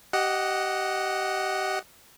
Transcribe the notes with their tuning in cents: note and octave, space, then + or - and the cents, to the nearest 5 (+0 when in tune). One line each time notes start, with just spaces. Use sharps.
G4 -25 D#5 +0 F#5 +0